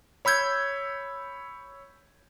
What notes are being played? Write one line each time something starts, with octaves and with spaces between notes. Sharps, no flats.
C#5 B5 E6 G6 G#6